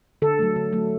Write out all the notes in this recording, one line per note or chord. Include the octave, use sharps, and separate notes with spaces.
D3 A4
F#3 A3
D3
F#3 A3